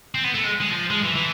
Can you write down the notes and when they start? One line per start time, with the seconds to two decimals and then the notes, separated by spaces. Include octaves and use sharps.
0.15 C4
0.24 B3
0.34 A3
0.44 G#3
0.61 G#3
0.71 F3
0.90 G#3
1.03 E3
1.15 E3